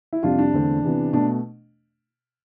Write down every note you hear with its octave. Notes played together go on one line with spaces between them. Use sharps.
E4
F2 C3 G3 D4 F4
D4
E2 D3 A3 C4
C3 E3 B3
B2 A3 D4